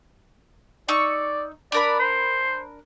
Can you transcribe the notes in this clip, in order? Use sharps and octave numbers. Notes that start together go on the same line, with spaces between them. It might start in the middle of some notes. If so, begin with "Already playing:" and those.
D#4 D5 C#6 E6
D4 A#4 D5 B5
C5